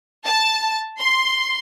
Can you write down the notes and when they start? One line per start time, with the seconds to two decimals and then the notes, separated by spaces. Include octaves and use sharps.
0.25 A5
1.00 C6